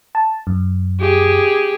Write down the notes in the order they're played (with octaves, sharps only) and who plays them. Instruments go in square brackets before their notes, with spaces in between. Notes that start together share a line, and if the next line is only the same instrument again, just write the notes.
[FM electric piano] A5
F#2
[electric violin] G4 G#4